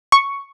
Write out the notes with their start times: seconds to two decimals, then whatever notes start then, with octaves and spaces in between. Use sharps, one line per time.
0.12 C#6